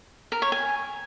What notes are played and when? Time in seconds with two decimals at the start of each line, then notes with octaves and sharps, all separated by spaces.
0.32 A#4
0.42 C#5
0.52 G#5